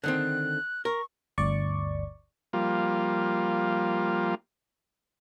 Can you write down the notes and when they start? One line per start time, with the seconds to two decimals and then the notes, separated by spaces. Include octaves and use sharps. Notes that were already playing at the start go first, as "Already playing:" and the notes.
0.04 D3 D#3 C4 F#6
0.85 A#4 C#6
1.38 G1 D2 D5 C#6
2.53 F3 G3 A#3 F4